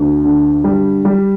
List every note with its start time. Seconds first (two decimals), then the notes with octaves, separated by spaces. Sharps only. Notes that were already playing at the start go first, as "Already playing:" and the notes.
Already playing: D2
0.25 D3
0.64 G3
1.05 G3